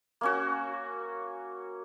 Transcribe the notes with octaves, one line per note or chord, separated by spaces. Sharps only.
A#3 C#4 F#4